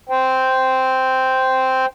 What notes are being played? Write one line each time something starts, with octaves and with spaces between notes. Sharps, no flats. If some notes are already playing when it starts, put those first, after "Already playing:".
C5 G5